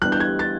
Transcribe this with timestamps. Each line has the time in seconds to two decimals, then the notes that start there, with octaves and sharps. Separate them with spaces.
0.02 E3 G3 B3 D4 F#6
0.12 G6
0.20 G#6
0.39 A6